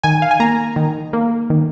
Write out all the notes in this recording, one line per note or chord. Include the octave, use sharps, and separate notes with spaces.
D#3 G#5
F5
G#5
A#3 A#5
D#3
A#3
D#3